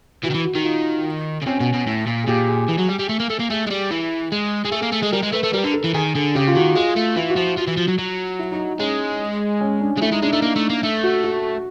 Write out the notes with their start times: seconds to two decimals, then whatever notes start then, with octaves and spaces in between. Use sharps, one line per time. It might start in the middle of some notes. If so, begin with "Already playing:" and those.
0.24 E3 F#4
0.31 D#3
0.35 E3
0.45 F#4
0.55 D#3 F#4
0.65 F4
1.42 C#3
1.46 C3 C#4
1.60 B2
1.74 B2
1.87 A2
2.07 A#2
2.24 G#4
2.28 A#2 G4
2.49 G#4
2.69 E3
2.79 F#3
2.89 G3
2.99 G3
3.09 A3
3.20 A#3
3.30 A3
3.39 A#3
3.50 A3 G#4
3.67 G#3
3.70 G3 G#4
3.91 E3
4.32 G#3
4.65 G#3 G#4
4.72 A3 A4
4.83 A#3
4.92 A3
5.03 G#3
5.12 G3 A#4
5.23 G#3
5.33 A3 B4
5.44 A3
5.54 G3 A#4
5.64 D3
5.74 A4
5.84 E3
5.94 D#3 G#4
6.15 D3 G#4
6.35 C#3 G4
6.48 F4
6.55 D#3 F#4
6.76 G#3 F4
6.96 A3
7.16 E3 E4
7.30 F#4
7.37 F3 F4
7.57 F3 F#4
7.67 E3
7.77 F3
7.88 F#3
7.98 F#3
8.39 E4
8.52 D#4
8.79 G#3 C#4
9.61 C#4
9.81 D4
9.97 G#3
10.01 A3 E4
10.12 G#3 D#4
10.22 G#3 D4
10.33 A3 D#4
10.42 A#3
10.56 A3
10.70 A#3
10.83 A3
11.03 F#4
11.24 F#4